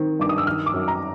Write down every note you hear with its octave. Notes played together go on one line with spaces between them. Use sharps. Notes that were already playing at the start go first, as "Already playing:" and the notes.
Already playing: D#3 C4
G2 D6
D#6
E6
D#3 F6
D6
F#2
A#5